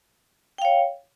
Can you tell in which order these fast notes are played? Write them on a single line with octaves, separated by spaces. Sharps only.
G5 F5 C#5